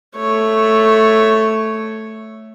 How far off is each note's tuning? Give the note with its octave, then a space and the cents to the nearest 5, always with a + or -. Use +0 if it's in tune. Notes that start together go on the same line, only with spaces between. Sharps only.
A3 +0 C#5 +0